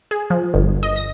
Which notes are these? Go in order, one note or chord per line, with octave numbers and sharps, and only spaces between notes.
G#4
F3
G1
D#5
A#6